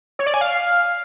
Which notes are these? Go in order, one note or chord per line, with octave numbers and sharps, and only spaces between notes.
C#5
D5
G#5
F5